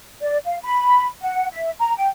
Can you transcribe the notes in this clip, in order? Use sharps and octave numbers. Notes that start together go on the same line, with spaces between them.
D5
F5
B5
F#5
E5
A#5
G5